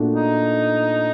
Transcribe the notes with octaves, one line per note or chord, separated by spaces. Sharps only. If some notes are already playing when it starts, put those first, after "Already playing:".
Already playing: A#2 A3 D4 F#4
D#4